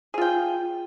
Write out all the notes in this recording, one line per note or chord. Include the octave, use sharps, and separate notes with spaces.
F4 G#4 G5